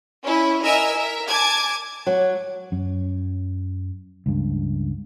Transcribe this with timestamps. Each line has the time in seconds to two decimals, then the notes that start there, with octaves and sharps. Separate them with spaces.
0.23 C#4 E4
0.63 A#4 D#5 E5 G#5 E6
0.97 A#4 E5
1.27 G#5 A5 D6 G#6
2.07 F#3
2.72 F#2
4.26 C#2 G2